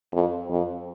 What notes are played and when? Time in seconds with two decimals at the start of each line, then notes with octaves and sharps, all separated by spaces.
0.13 F2
0.50 F2